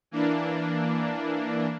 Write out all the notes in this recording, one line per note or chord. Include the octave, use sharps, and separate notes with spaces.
E3 A#3 D4